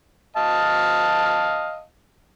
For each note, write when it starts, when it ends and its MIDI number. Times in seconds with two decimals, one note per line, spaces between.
0.37 1.82 75
0.37 1.82 77
0.37 1.82 81